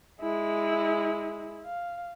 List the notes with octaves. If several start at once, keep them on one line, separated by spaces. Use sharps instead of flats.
G#3 E4
F5